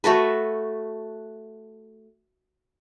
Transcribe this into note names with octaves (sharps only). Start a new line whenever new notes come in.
A3 F#4 A4 B4